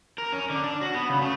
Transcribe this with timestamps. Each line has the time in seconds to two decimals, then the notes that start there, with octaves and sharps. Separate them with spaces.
0.18 A#4
0.32 C#4
0.50 D3
0.64 D4
0.81 F#4
0.95 B3
1.10 C#3
1.22 A3